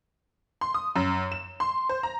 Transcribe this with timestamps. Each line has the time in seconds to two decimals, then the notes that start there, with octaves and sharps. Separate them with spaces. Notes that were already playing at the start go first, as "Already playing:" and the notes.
0.61 C6
0.74 D#6
0.96 F#2
1.32 E7
1.60 C6
1.89 C5
2.03 A#5